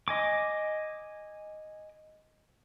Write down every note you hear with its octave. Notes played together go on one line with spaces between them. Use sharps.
D#5 G#5 D6